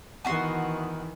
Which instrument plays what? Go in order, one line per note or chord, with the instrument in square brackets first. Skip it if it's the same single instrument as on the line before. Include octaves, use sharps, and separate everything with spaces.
[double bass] D#3 E3 [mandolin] B3 F#4 C6